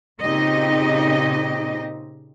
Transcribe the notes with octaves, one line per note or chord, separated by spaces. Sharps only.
A#2 C#3 C4 D#4 G4 D#5